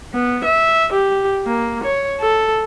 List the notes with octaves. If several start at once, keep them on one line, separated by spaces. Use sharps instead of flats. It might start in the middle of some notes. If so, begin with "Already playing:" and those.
B3
E5
G4
A#3
C#5
A4